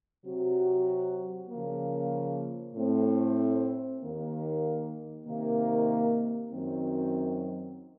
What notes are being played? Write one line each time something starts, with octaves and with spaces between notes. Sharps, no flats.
C3 F#3 C4 F#4
C#3 F3 A#3
A2 A3 C4
D#2 D#3 A#3
C3 D#3 A#3
F#2 D#3 F#3 C4